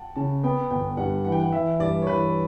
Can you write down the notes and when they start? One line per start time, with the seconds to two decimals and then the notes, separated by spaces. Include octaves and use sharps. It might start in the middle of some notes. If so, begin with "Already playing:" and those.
Already playing: F#5 G5 A5
0.16 C#3 A5
0.43 B3 G5
0.71 G1 G5
0.97 G2 F#5
1.25 E3 F#5
1.32 G5
1.40 F#5
1.52 E3 E5
1.80 G2 D5
2.02 C#5
2.07 E3 B4